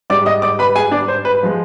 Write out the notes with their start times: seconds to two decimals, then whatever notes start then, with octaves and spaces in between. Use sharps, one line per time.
0.10 G#2 G3 D5 D6
0.26 D#5 D#6
0.42 D5 D6
0.59 B4 B5
0.76 G#4 G#5
0.91 D4 D5
1.08 C5
1.25 B4
1.43 F3 G#3